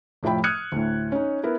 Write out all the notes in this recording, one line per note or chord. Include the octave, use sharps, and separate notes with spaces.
F1 A2 F3 E4 G5 B5
D#6 F6 F#6 G#6 C#7 D#7
D2 A2
C#4 D#4
B3 E4 A#4